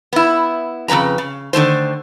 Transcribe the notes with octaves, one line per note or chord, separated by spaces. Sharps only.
B3 E4
F2 C#3 G3 B4 A#5
C#3
D3 D#3 A3 C5